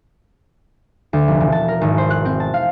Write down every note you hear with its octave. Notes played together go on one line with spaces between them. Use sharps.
D2
F1
E1
A5
A#4
G#1
C5
F#6
C4
A5
F5